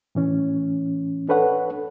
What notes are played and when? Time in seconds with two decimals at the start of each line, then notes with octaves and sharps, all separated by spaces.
0.15 A2 E3 C#4
1.29 D4 A4 B4 C#5 F#5